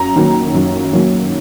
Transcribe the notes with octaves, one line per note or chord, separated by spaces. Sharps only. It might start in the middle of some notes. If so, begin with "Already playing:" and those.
Already playing: F#2 A#5
D#3 F#3 A#3
F#2
D#3 F#3 A#3